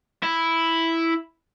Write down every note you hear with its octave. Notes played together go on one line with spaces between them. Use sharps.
E4